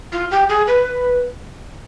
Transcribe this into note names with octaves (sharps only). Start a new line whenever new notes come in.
F4
G4
G#4
B4